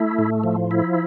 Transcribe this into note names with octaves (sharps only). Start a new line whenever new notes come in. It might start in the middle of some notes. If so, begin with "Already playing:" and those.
Already playing: A3 E4
A2
F3
E4